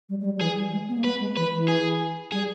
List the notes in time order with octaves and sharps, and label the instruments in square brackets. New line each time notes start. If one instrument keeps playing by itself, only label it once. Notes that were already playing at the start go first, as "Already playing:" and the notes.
[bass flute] G3
G#3
G3
G3
[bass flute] E3 [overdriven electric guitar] G#4
[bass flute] G3
G#3
B3
A#3
[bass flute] B3 [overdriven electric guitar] B4
[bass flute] G#3
[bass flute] E3 [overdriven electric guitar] B4
[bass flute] E3
[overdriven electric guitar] G#4
[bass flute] G3 [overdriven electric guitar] G#4